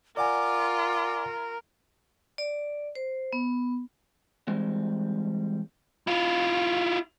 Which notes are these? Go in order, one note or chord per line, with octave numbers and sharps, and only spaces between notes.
F4 A#4 D5 F#5 G#5 D6
D5
C5
B3
E3 G3 G#3 C4
E4 F4